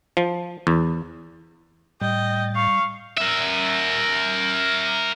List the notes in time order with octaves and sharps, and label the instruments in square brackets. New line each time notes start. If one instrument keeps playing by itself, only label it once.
[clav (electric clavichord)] F3
E2
[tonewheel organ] A2 A6 [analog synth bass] G3 [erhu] D#5 [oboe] G5
[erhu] F5 [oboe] C#6
[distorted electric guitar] A#4 E5